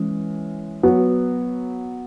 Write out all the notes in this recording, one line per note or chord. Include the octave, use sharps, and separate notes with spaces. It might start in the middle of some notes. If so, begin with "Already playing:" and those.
Already playing: E3 G#3 C#4
F#3 B3 F#4